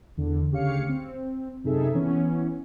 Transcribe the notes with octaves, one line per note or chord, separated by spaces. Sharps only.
E2 D3
D2 C#3 G4 C#5 F5 C#7
C4
F#2 C3 D#4 G#4 A4 E5
E3 B3 C#4